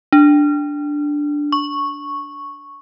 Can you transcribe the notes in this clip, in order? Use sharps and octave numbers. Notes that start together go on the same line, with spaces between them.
D4
C#6